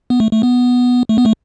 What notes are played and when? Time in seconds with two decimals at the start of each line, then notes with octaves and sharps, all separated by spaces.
0.10 B3
0.20 A3
0.32 A3
0.43 B3
1.09 A3
1.18 B3
1.25 A3